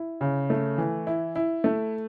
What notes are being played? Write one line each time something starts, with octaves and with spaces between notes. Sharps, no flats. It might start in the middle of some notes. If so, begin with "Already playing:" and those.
Already playing: E4
C#3
A3
E3
E4
E4
A3